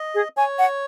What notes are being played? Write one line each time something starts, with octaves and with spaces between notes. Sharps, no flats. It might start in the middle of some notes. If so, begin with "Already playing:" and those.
Already playing: D#5
G#4
C#5 G#5
F#5